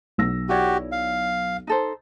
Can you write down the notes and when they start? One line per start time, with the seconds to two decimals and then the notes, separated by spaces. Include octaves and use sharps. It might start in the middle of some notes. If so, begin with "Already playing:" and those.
0.18 B1 E6 A#6
0.49 E4 F#4 G4 C#5 D5
0.92 F5
1.67 D#4 A4 C5